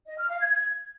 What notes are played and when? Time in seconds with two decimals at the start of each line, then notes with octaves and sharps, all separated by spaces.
0.07 D#5
0.18 F6
0.29 F5
0.40 G#6